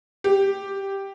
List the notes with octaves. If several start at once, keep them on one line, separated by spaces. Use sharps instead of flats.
G4